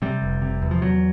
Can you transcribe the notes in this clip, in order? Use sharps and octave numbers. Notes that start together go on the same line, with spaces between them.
C3 G3
F1
C3
E2
F3
E2 F#3